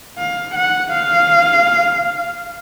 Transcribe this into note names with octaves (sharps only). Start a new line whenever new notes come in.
F5
F#5
F5